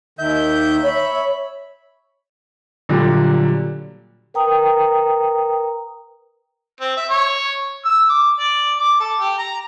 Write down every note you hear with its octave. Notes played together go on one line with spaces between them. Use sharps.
D#2 D#3 E5 G6
C#5 B5
A#2 D3 F#3 G3
A#4 B4 G5 A#5 D#6
C4
E5
C#5
E6
D6
D5
D6
A4
G4
A#5